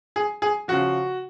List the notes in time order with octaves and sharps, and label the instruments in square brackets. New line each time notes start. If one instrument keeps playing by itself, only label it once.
[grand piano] G#4
G#4
C#3 F3 F#4